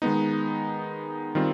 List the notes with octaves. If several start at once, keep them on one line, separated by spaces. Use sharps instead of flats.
D#3 G#3 B3 D#4
D#3 G3 C4 F4